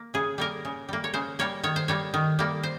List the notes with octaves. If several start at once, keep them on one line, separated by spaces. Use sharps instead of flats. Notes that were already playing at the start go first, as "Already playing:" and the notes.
Already playing: A#3
C#3 G#4
G3 A#3 A#4
C#3
G3 A#3
C#5
C#3 C5
G3 A#3 C#5
D#3 C#5
C5
G3 A#3 C#5
D#3
G3 A#3
C5